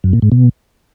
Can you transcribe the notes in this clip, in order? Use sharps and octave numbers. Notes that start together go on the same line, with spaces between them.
F#2
A#2
G#2
B2